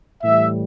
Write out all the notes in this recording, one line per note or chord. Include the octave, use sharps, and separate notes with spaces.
A2 E3 G3 E5